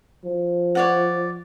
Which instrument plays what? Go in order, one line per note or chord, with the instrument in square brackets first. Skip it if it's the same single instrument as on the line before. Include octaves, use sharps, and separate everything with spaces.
[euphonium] F3
[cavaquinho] C#5 D5 F#5